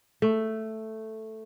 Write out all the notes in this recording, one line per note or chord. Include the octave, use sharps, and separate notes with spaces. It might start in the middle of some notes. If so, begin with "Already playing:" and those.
A3